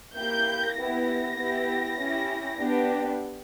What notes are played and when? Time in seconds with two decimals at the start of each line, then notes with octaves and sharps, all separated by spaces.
0.17 A#3 E4 G4 G6
0.77 B3 E4 G4 A#6
1.37 B3 E4 G4
1.98 C#4 E4 G4
2.58 B3 D4 G4